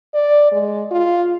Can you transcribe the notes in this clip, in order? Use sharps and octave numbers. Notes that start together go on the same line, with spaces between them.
D5
G#3
F4